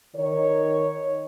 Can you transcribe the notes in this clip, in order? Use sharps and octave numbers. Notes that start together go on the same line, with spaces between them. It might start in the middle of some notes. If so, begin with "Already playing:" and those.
D#3 C#5